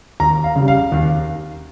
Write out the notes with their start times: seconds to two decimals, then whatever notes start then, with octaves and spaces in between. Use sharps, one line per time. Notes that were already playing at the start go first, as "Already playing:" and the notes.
0.20 D#2 A#5
0.44 F5
0.56 C#3 G3
0.68 F5
0.92 D#2